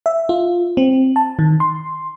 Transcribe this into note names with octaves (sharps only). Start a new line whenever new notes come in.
E5
F4
C4
A5
D#3
C6